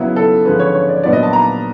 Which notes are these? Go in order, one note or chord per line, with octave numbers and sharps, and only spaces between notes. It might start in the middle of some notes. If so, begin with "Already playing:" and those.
Already playing: C#3 F#3 B3 E4
A4
D3 F3 G#3 C#4 B4
C#5
C#5
D5
A#2 F#3 B3 D4 F4 D5
D#5
A5
A#5